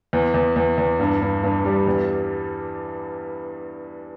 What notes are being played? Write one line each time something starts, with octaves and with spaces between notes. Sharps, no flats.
E2
E2
E2
E2
G2
G2
G2
G3
E2